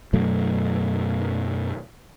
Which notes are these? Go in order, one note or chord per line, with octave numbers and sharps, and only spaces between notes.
F#2 B2 F#3 A3